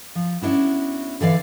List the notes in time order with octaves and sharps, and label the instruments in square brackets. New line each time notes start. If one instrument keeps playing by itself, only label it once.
[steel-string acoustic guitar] F3
B3 C#4 D4 E4 F#4
D3 E3 D5 F5